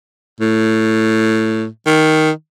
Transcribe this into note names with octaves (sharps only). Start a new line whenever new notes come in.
A2
D#3